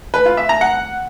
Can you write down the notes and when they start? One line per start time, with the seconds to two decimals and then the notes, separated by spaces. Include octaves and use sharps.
0.14 B4
0.26 F4
0.37 E5
0.49 A#5
0.61 F#5